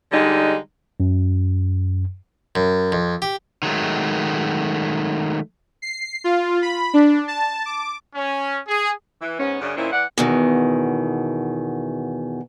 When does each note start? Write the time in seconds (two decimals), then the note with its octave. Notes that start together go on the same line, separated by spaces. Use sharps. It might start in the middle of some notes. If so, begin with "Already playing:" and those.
0.12 D3 G3 G#3 D#4
1.00 F#2
2.55 F#2
2.92 F2
3.22 G4
3.63 D#3 F#3 G#3 A3
5.82 C7
6.24 F4
6.62 B5
6.94 D4
7.28 A5
7.66 D6
8.15 C#4
8.67 G#4
9.22 E3
9.39 G#2 B3 C#4
9.61 F#2 C#3 C#4 D4
9.77 A#2 D#3 C4 C#4 E4
9.92 E3 D5 F#5
10.18 E2 B2 D#3